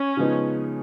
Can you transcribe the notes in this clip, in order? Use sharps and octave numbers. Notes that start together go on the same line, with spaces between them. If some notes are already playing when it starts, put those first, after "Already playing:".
Already playing: C#4
C#3 F3 G#3 B3 D#4